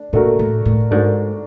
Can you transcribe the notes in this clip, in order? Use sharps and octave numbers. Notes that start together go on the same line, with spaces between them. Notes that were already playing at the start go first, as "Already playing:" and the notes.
Already playing: A3 D4
A#2 A3 D4 F#4 A#4
A2
A2
G#2 A3 D4 F#4 A#4